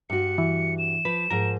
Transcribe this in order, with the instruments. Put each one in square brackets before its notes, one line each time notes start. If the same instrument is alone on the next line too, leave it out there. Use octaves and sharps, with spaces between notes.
[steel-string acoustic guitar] G2 F#4 [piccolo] C#7
[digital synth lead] E3
[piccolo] E7
[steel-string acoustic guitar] F3 [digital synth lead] B4
[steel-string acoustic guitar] G#2 F3 [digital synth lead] A#4